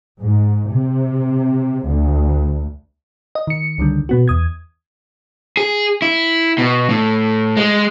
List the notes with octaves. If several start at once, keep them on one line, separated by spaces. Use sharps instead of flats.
G#2
C3
D2
D#5
D#3 C#7
C#2 D3 D#3 G3
B2 B3 F#4
E2 D#6 G#6
G#4
E4
B2
A2
G#3